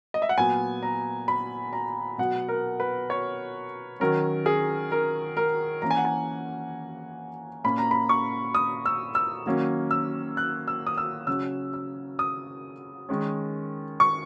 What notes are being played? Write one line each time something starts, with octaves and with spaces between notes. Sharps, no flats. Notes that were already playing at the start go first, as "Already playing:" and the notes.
D#5
E5
F#5
A#2 F#3 B3 G#5
A#5
B5
A#5
B2 F#3 B3 F#5
A#4
B4
C#5
D#3 F#3 C#4 A#4
G#4
A#4
A#4
E3 A#3 C#4 A#5
G#5
F#5
G#5
A#2 A#3 C#4 B5
A#5
B5
C#6
D#6
E6
E6
D#3 F#3 A#3 C#4
E6
F#6
E6
D#6
E6
C#3 F#3 C#4 E6
E6
D#6
D#3 G#3 C#4
C#6